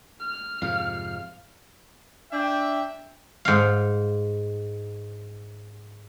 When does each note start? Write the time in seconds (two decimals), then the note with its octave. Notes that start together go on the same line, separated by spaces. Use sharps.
0.21 F6
0.62 F2 G#2 C3 F5
2.32 D4 E5 G5
3.45 G#2 F5